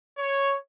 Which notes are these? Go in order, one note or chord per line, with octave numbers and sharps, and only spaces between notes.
C#5